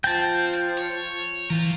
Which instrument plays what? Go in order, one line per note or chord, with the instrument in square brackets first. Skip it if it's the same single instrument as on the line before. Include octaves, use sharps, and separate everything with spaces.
[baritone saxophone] F3 [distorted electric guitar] C4 [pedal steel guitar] G5 A5
[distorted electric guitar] C#5
[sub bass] E3 [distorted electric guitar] F4 A#4